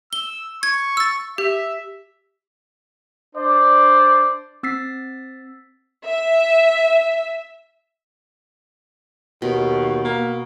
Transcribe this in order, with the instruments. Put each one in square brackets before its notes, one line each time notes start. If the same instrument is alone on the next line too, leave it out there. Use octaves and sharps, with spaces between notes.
[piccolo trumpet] E6 [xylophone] G7
[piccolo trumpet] C#6 [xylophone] G#6
[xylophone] E6 A6
[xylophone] G4 [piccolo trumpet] E5
[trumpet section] D4 C5 D5
[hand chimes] C4 E6 A6 B6 C7
[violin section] E5
[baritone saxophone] D#2 [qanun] B2
[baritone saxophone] A#3